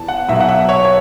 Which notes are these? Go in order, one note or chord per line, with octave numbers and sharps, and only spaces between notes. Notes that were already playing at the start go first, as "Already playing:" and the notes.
Already playing: E2 E3 A5
F#5
B1 B2 F#3 E5
F#5
E5
C#5
C#5